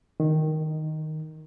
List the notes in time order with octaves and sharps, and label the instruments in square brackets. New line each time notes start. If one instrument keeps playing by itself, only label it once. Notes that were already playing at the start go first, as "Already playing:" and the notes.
[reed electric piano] D#3